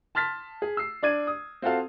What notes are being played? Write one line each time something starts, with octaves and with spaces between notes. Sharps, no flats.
A5 C6 F6 A6 B6
G#4
E6 C7
D4 D5 G#6 D#7
D#6
C4 F4 F#4 A4 F5